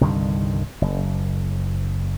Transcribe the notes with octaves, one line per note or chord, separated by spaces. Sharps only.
C2 G2 D3 D#3
F#1